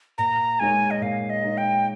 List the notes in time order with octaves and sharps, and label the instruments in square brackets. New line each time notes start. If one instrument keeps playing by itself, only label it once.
[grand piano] A#2 [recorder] A#5
[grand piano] G#3 D#4 A#4 C#5 [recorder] G#5
[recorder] D#5
[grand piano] A#2 [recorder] F5
[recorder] D#5
[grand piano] G#3 D#4 A#4 C#5
[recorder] G5